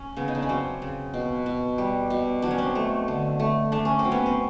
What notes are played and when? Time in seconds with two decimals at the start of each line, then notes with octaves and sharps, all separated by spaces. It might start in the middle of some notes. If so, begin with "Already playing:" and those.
Already playing: C#4
0.17 C#3 B3
0.28 D#4
0.35 D4
0.42 C#4
0.49 F#3 C4
0.82 C#3
1.14 B2
1.46 B2
1.78 G3
2.10 B2
2.42 F#3 D4
2.51 C#4
2.58 C4 D4
2.75 A3
3.08 D3
3.40 A3
3.72 A3 D4
3.85 C#4
3.99 C4
4.05 F#3
4.11 B3 C#4
4.26 C4